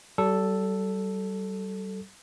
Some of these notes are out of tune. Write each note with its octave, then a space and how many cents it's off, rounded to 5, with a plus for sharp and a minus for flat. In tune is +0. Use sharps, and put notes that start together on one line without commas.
G3 -35 A4 +0